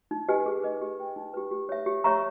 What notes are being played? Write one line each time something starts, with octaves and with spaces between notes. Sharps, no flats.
D#4
G4 B4 D#5 G#5
G#4
B4 D#5
G4
B4 G5
D#4
G4 B4
G4
C#5 E5
G4
C#5 E5 A#5 C#6